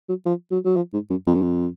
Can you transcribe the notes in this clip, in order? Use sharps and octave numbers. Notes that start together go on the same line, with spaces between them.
F#3
F3
F#3
F#3
F3
G#2
F#2
F2
F#2
F2